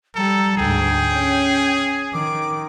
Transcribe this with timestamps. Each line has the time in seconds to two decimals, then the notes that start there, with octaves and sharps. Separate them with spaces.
0.15 G3 A4 A#5
0.57 D2 G#2 G#4 G5
1.12 C#4
2.13 D#3 D6